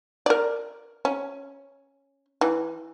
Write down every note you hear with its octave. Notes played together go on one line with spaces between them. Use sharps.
A#4 D5
C#4
E3